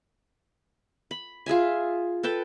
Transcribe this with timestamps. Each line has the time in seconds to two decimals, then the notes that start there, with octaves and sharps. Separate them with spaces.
1.11 B5
1.46 F4 G#4 E5 G#5
2.23 A4 B4 G5 A5